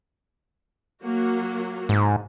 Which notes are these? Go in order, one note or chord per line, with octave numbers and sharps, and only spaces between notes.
F#3 A#3 F#4
G#2